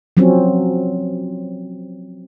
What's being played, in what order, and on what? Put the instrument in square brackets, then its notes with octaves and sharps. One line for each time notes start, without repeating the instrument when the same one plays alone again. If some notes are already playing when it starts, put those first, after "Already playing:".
[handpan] F3 F#3 C4 C#4